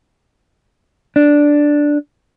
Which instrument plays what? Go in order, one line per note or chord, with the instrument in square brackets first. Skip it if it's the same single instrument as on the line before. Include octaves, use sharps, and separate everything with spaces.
[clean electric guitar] D4